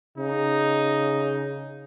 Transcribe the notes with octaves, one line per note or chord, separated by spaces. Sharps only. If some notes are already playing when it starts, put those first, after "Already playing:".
C#3 D#4